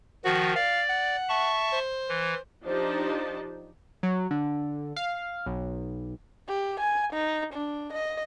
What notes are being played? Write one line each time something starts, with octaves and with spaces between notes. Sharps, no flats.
D#3 F3 F#4
D5 F5
F#5
E5 A5 C#6
C5
E3
F3 D4 D#4 G4 C5 A5
F#3
D3
F5
B1
G4
G#5
D#4
D4
D#5